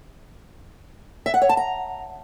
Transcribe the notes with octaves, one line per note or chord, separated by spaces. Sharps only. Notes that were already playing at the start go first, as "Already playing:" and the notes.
E5
F#5
C#5
A5
A#5